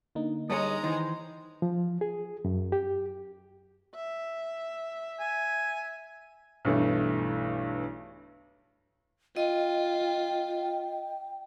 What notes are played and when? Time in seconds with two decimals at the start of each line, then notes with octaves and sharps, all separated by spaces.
0.15 D3 A#3 D#4
0.50 G2 G#3 C#5 D#5 A#5
0.84 D#3 E3 C5
1.62 F3
2.01 G#4
2.45 F#2
2.72 G4
3.95 E5
5.19 G#5
6.65 B1 G2 E3 A3
9.36 F4 D#5 G5